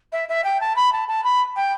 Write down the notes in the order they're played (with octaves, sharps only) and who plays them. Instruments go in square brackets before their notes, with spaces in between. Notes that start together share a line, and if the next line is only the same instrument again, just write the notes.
[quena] E5
E5
G5
A5
B5
A5
A5
B5
G5